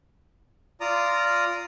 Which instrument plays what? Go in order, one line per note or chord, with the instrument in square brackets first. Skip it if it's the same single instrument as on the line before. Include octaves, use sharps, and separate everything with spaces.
[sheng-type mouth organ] F4 D5 A#5 D#6